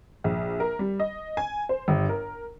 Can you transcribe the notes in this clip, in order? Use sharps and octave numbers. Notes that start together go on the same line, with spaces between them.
A#1
A#4
G3
D#5
G#5
C5
G1
A#4